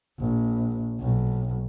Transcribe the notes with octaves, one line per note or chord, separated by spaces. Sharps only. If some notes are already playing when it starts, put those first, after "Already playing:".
A#1
B1